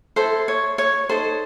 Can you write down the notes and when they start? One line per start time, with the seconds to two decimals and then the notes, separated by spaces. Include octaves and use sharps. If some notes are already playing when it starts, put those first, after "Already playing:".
0.16 E4 A4 C5
0.48 C#5
0.78 C#5
1.09 D#4 A4 C5